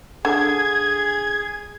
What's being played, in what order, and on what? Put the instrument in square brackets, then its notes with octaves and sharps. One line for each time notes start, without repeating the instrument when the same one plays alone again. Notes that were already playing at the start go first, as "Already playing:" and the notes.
[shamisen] D3 [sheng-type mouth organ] G#4 [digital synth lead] G#6